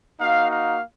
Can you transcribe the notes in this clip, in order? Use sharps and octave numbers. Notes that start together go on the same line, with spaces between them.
A#3 D#4 F#4 F5
F5